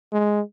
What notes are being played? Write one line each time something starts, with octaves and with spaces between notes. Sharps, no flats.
G#3